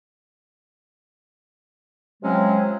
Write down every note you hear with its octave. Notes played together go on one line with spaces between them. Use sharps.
C3 F3 F#3 G#3 C4 C#4